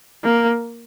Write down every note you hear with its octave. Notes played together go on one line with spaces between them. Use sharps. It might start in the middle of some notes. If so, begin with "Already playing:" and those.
A#3